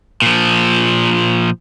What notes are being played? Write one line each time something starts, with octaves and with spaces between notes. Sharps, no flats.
A#2 F3